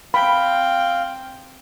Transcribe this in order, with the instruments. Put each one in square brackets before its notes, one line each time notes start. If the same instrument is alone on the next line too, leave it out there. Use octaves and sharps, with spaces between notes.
[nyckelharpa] C4 G5 [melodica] F5 [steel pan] B5